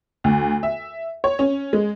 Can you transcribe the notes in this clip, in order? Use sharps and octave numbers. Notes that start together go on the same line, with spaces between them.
D2
E5
C#5
C#4
G#3